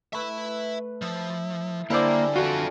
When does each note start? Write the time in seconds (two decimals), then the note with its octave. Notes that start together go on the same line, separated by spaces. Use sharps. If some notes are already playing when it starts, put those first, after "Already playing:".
0.13 A3 B4 E5 B5
1.02 F3 E4
1.90 D3 G3 A#3 D4 E4 G#4 C5 D5
2.36 F4 F#4 A4